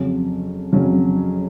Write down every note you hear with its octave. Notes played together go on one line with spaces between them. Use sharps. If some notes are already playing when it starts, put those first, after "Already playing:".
Already playing: F2 C#3 F#3 C#4
F2 C#3 F#3 C#4